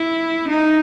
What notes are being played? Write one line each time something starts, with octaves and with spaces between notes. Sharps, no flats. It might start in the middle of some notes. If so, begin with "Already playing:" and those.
Already playing: E4
D#4